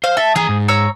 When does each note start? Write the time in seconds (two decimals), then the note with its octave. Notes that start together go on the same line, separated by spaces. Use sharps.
0.04 C5 F5
0.17 A4 E5
0.36 E3 G#4 A#5
0.49 G#2
0.68 C#5 A#5 E6